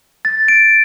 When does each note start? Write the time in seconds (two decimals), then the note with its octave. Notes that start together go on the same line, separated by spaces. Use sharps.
0.25 A6
0.48 D7